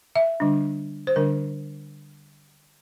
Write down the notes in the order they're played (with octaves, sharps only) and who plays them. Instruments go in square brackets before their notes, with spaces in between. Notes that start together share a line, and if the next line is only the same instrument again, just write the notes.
[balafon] E5
D3 G3 D4
C5
D3 G3 D4 A#4